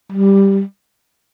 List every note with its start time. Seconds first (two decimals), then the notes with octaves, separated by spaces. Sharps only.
0.12 G3